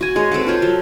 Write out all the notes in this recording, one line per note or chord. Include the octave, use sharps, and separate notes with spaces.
F#4 G#5
G#3 C#5
C4 A4 B4 F#5
F4 C5 C#5
F3 F#3 A4